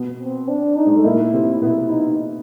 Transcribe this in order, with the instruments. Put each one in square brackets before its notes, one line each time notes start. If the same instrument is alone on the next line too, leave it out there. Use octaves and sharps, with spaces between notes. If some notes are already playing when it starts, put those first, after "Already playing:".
Already playing: [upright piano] B2 B3
[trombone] C4
D4
D#4
[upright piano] G#3
A3
[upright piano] A#2 A#3 [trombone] E4
[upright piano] C3 C4
C4
[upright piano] B2 B3 [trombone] E4
[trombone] D#4